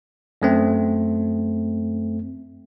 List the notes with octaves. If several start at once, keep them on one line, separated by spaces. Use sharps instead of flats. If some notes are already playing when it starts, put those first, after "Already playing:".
F#2 A3 C4